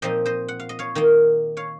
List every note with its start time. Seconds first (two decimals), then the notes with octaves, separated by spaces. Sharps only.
0.02 A#2 F3 C4 D#4 C5 D#5
0.26 C5 D#5
0.48 F#5
0.60 F5
0.69 D#5
0.79 C#5 F5
0.95 D#3 A#3 D#4
1.57 C#5 F5